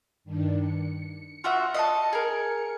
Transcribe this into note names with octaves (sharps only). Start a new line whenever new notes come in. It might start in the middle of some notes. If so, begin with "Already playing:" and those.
G2 D#3 D4
C#7
F4 F#4 E5
D#5 F5 A5
G#4 A#4